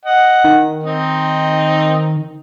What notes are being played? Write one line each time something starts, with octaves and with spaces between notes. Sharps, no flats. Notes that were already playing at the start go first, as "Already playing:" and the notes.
D#5 F#5
D#3
C4 D#4